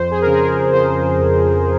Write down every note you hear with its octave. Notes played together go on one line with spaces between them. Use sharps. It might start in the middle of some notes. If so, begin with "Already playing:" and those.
Already playing: F2 C5
G#4
C#3 A#4
G#4
A#4
F3 C5
F2